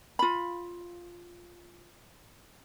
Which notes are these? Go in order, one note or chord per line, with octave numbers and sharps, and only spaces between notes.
F4 B5